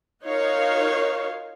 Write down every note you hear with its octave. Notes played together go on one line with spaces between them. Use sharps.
D#4 F4 F#4 A#4 C#5 F5